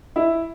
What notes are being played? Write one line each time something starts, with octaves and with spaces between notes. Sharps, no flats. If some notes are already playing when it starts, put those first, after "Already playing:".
E4